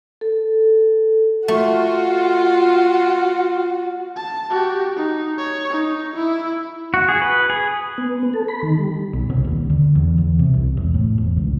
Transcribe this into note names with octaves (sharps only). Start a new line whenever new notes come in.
A4
A3 F4 F#4
A5
F#4 G4
D#4
C#5
D#4
E4
F#4
G#4
B4
G#4
B3
A4
B5
D#3
G3
B1
C2
D#1
D3
E2
E2
C3
C2
E1
A2
E1
C#2